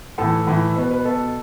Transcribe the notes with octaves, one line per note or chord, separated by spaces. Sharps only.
A2 E3 A4
A2 E3
B2 B4
B4
B2 A4